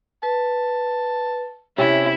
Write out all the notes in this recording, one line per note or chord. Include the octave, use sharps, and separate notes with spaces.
B4 A5
C3 C#4 E4